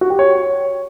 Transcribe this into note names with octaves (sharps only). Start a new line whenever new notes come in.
F#4
G4
C#5